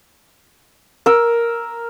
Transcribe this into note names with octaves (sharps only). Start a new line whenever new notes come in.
A#4 E6